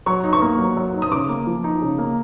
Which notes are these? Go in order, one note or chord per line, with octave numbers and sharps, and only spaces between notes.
F#3 C#6
D#4
C#6
A#3
F#3
F#3
D#4
D#6
C#3 D6
A#3
F3
D#4
C#3
A#3